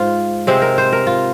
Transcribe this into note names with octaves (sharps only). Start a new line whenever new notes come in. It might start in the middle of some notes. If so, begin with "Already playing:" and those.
Already playing: G#2 F4 C5
C3 G#3 C4
A#4
C5
A#4
F4